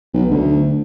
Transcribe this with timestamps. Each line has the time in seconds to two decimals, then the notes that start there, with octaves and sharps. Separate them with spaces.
0.14 B1
0.30 D2